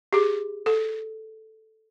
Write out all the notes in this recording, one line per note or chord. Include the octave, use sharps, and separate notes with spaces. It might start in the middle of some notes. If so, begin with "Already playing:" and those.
G4 G#4
A4